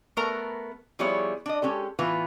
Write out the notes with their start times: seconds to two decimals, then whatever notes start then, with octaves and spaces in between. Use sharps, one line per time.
0.17 A3 B3 A4 A#4 A#5
0.99 F3 G3 B3 E4 G#4 C#5
1.46 D4 D#5
1.62 G#3 C#4 G4 A4
1.99 A2 E3 B3 F4 B4